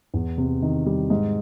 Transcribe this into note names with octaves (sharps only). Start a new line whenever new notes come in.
E2
C3
D#3
G3
G#2